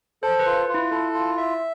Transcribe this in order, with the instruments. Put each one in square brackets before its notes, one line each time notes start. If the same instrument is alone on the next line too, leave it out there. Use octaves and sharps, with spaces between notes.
[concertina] A4 [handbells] C5
[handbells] B4
[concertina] F4
F4
[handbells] E4
[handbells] E4 [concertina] A4
[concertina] F4
E5